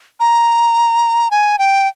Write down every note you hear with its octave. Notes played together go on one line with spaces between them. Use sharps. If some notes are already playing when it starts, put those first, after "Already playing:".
A#5
G#5
G5